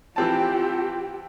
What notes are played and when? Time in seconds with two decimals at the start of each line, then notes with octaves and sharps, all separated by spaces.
0.16 E3 C4 F4 G4 A5